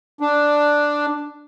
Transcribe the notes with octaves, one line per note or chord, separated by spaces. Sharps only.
D4